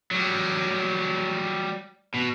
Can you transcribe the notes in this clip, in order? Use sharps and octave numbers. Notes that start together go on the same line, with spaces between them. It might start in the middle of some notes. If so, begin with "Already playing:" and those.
F#3 G3
B2